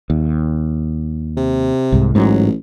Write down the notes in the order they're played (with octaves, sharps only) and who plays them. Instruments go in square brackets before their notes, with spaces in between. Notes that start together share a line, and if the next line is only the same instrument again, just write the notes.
[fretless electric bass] D#2
[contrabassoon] C3
[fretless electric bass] C2 G#2
[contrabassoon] A1 [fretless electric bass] G#2 F#3